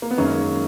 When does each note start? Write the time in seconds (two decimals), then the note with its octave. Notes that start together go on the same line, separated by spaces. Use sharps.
0.02 A#3
0.11 B3
0.17 F#2 D#3 G#3 A#3 C#4